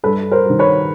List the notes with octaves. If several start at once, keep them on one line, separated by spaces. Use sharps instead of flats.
G2 A4 B4
A#4 C5
D#3 G3
B4 C#5